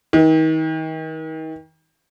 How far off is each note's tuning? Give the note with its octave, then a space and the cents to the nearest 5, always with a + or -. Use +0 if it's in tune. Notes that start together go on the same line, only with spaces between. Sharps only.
D#3 +35